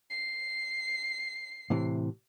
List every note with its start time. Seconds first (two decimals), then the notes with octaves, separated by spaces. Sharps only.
0.10 C7
1.70 A2 C3 E3